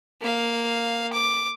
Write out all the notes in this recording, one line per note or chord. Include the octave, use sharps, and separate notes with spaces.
A#3 F5
D6